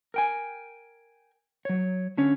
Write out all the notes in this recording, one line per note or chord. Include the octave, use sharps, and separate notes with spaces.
A#4 G5 G#5
F#3 C#5
D3 C#4 C#5